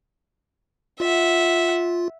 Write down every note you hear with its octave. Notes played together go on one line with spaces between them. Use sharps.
F4 E5 F#5